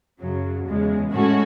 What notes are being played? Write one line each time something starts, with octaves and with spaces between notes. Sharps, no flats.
F#2 C#3 F#3
E2 C#3 G#3
A2 G#3 C#4 F#4 A4